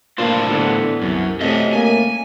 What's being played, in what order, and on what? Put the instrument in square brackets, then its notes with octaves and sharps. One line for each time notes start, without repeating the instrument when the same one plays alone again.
[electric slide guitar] A2 D4 C5 [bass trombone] A#3 [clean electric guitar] F4
[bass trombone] D3 [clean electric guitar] E3 B3
[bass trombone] C2 [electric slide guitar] F#2
[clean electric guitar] C2 A3 C#4 [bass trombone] C3 [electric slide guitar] D#5 E5
[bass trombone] A#3 [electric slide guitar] G#5